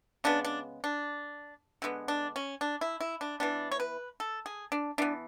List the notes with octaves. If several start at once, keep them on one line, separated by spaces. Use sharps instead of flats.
C#3 G#3 B3 D4
D4
D4
D3 G#3 B3
D4
C#4
D4
E4
E4
D4
E3 B3 D4
C#5
B4
A4
G#4
D4
E3 B3 D4